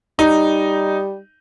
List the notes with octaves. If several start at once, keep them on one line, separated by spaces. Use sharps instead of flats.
G3 D#4